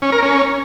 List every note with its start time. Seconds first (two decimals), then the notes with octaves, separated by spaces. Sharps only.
0.02 C#4
0.12 A#4
0.22 C#4